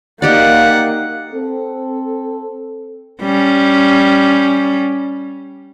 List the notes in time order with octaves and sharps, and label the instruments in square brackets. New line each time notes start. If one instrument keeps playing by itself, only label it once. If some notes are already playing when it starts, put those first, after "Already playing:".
[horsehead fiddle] A#3 [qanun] D#4 G4 D5 [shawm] F#5
[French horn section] C4 A4
[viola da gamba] G3 C#4